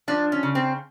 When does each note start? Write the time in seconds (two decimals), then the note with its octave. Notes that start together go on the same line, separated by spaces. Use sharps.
0.08 F3 D4
0.32 C#4
0.43 C#3
0.55 C4